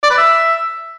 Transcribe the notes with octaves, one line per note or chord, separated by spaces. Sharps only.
D5
B4
E5